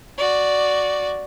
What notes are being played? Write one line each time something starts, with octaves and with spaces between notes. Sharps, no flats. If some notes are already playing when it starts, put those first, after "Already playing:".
F#4 D5